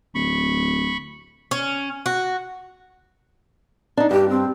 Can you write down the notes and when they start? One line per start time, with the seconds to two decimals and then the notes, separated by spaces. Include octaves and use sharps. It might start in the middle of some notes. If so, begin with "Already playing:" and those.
0.15 D1 B5 C#6
1.51 C#4
2.06 F#4
3.97 D4 D#4
4.11 G2 G4
4.29 C4